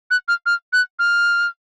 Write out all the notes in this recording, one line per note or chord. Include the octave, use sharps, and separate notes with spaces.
F#6
F6
F6
F#6
F6